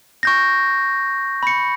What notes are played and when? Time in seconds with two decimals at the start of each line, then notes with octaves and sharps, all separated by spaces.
0.23 C#6 G6 A#6
1.43 B5 C#7